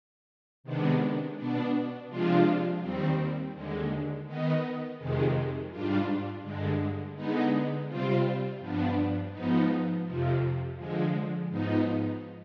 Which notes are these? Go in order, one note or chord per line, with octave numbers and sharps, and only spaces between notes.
C3 D#3 G#3 B3 D4
B2 B3 D4
C3 F3 G#3 D4 F4
D#2 D#3 G3 C4
D#2 D3 G#3
D#3 B3 D#4
F2 C3 D#3 G#3
G#2 G3 D4 F4
G2 D3 G#3
D3 G#3 B3 D#4
C3 G3 C4 F4
G2 F3 B3 D4
G#2 F3 B3 D#4
F2 C3 F3
D3 F3 G#3
G#2 F3 B3 D#4